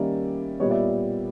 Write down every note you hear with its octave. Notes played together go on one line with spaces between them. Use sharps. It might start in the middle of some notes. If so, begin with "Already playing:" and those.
Already playing: D#3 G3 A#3 C#4 D5 E5
A#2 G3 B3 C#5 D#5
D5 E5